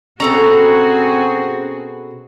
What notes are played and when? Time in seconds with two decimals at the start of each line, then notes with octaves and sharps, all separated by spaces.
0.20 B2 C4 C#4 F#4 G#4 A4 A#5